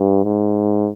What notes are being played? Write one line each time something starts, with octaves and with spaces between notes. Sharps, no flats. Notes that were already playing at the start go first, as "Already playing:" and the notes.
Already playing: G2
G#2